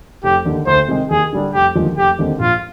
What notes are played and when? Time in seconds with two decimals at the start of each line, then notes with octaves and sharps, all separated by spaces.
0.24 F1 G4
0.45 D#2 D3
0.67 D2 C5
0.88 C3 D#3 G#3
1.10 D#2 G#4
1.33 D3 G3 D4
1.54 F1 G4
1.75 D#2 D3 F3 G#3
1.97 F1 G4
2.19 D#2 D3 G#3 C4
2.40 A#1 F4